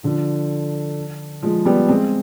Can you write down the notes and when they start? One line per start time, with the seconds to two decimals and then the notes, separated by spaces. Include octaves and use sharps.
0.03 D3 F3
1.42 F3 G#3
1.65 G3 B3
1.89 G#3 C4